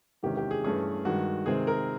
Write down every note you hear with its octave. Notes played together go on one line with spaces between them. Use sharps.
E2 C3 D#3 G#3 C#4 G4
G4
G#4
G2 E3 A3 C#4 G#4
G2 D#3 G#3 F#4
C3 D#3 G#3 C4 G#4
A#4